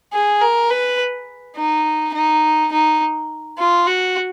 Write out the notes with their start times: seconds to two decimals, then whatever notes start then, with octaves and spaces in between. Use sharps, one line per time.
0.13 G#4
0.41 A#4
0.70 B4
1.56 D#4
2.14 D#4
2.72 D#4
3.58 F4
3.87 F#4